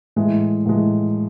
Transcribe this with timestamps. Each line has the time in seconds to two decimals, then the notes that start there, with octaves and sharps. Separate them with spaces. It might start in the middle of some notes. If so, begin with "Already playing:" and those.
0.16 A2 E3 G#3
0.65 A2 E3 G#3